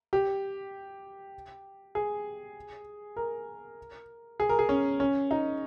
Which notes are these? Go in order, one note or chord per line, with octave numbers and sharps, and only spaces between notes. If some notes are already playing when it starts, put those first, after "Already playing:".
G4
G#4
A#4
G#4
A#4
G#4
C#4
C#4
D#4